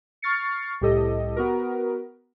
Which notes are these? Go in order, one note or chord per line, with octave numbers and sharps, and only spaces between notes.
C#6 F6 A6 C7 C#7
C2 A2 G4 A4 D#5
B3 F#4 A#4